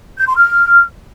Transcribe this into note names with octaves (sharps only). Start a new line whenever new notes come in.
G6
C6
F6